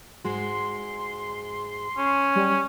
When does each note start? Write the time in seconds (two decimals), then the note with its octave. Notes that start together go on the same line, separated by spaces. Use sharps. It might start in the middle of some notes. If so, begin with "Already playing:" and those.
0.25 G#2 G#3 F#4 C6
1.97 C#4
2.36 G3